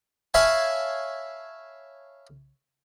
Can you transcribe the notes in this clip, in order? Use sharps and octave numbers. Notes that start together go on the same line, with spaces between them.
C#5 E5 F5 G#5 A5 B5